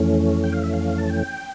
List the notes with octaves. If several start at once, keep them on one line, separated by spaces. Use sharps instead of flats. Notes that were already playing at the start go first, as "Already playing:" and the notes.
Already playing: F2 E3 A3 C#4
G5
F5
E5
F5
A5
G5